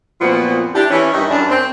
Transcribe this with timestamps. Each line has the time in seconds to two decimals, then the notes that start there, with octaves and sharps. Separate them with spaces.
0.21 F#2 A#2 F3 B3 C4 F#4
0.75 D4 E4 G4
0.90 E3 C#4
1.13 G2 D#3 C#5 E5
1.30 F#2 G3 D4
1.49 C4